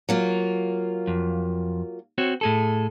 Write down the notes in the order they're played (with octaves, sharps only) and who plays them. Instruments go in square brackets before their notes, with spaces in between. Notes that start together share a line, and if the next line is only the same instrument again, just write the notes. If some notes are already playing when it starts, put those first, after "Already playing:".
[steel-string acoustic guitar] F#3 A#3 F4
[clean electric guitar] F2
C4 F#4 C#5
A2 G#4 A4